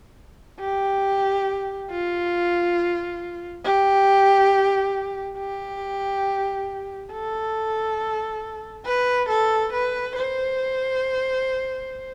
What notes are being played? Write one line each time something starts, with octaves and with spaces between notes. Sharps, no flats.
G4
F4
G4
G4
A4
B4
A4
B4
C5